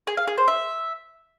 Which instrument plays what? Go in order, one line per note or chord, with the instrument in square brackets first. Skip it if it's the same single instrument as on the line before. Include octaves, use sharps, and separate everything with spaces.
[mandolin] G#4
F5
G#4
C5
E5